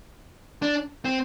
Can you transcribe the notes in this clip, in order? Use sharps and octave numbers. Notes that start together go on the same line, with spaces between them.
D4
C4